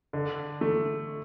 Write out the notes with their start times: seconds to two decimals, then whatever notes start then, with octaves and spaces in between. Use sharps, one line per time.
0.13 D3
0.61 A3